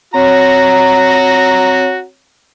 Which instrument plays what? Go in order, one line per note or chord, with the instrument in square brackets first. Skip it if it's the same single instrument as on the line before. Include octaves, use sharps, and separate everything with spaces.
[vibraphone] C4 C#5 [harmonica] F#4 A#5